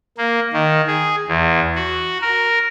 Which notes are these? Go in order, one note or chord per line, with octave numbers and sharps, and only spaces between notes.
A#3
D#3
G#4
E2
F#4
A#4